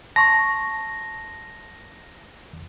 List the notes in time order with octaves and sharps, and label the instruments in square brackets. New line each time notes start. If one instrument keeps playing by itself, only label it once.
[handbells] A5 C6 C#6 [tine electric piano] A#6